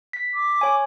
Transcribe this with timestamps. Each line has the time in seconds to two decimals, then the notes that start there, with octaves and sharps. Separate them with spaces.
0.13 B6
0.34 D6
0.61 C#5 G#5